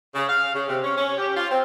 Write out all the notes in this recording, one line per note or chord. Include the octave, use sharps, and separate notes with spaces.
C#3
F5
C#3
C3
C#4
C#4
G4
F4
C4